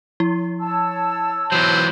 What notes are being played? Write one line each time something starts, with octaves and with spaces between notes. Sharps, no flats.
F3 E4
C#5 A5 E6
E3 F#3 B3 C5